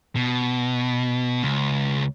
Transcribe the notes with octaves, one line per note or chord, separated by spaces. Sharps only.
B2
C#2